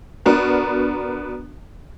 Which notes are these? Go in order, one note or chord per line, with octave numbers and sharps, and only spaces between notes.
B3 D4 F#4 A#4